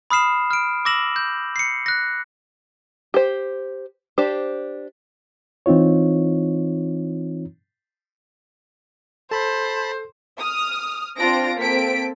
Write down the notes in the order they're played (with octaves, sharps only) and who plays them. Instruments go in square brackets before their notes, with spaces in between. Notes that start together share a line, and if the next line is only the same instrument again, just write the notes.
[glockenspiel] B5 D#6 F6 C7 E7
F6 D7
D6 E6 A#6 E7 F#7
G6
C7 C#7
F#6 A#6
[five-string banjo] G4 C5
D4 G4 C5
[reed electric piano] E3 C4 D#4 F4 C#5
[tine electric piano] A4 [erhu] C5 [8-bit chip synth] A5 B5
[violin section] D#6 F6
C4 D4 F4 C5 A#6 D7
A#3 C4 A4 B6 D7